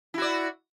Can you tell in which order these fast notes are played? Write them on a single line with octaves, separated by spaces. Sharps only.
E4 F#4 D5